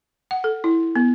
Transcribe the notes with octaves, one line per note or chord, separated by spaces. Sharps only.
F#5
A4
E4
B3